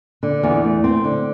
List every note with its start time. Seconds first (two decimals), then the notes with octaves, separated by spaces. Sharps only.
0.23 D3
0.43 E2
0.64 A3
0.84 C4
1.04 D3